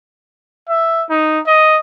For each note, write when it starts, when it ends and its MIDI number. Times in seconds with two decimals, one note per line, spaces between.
0.69 1.04 76
1.09 1.39 63
1.46 1.80 75